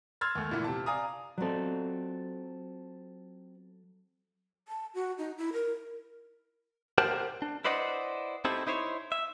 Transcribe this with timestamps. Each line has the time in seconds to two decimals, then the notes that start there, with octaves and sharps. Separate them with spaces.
0.21 C6 E6 F6 G#6 A6
0.35 D#2 A3
0.51 A#2 D3 E3 E4
0.64 C3 A5
0.86 D5 F5 G#5 A#5 D#6
1.38 F#3 C4 F4 A4 D5
4.68 A5
4.94 F#4
5.18 D#4
5.38 E4
5.53 A#4
6.98 G4 A#4 C5 F#5 G5 A5
7.42 D4
7.65 E4 B4 C5 D5 D#5 F#5
8.45 C4 D#4 E4 G4 A4
8.67 D#4 E4 C5 C#5
9.12 E5